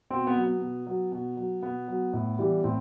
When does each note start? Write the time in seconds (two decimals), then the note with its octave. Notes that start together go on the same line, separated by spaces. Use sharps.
0.11 B2 C4
0.27 B3
0.35 F#3
0.44 B3
0.61 B2
0.87 F#3
1.12 B2
1.37 F#3
1.62 B2 B3
1.88 F#3
2.13 A2
2.39 E3 G3
2.64 A2 C4